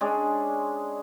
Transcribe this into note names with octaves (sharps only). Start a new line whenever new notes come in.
G#3 C#4 D4 G#4